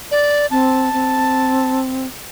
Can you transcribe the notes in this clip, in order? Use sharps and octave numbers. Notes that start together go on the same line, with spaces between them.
D5
C4 A5
C4